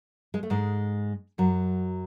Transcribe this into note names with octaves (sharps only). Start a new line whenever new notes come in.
G#3
A3
G#2 G#3
F#2 F#3